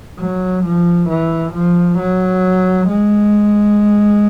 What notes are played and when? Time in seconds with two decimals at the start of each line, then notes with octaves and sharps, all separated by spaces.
0.19 F#3
0.65 F3
1.09 E3
1.53 F3
1.99 F#3
2.88 G#3